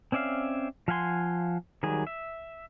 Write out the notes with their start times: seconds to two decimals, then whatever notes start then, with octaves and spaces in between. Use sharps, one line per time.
0.12 C4 C#4 D5 E5 F5
0.88 F3 F5 F#5 G#5 C6
1.83 D#3 F#3 G3 G#4
2.07 E5